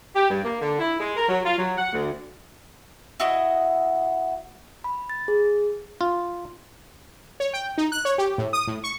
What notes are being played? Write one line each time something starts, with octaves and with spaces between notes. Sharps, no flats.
G4
G2
A#3
D3
E4
G#3
A#4
F#3
F4
F#3
F#5
D2
E4 F#4 D#5
B5
A6
G#4
F4
C#5
G5
D#4
F#6
C#5
G4
A2
D#6
A2
C#6